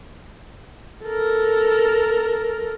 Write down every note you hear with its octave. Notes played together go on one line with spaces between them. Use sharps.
A4 A#4